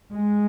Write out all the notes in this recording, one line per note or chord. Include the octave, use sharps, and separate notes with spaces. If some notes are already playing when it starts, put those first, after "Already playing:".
G#3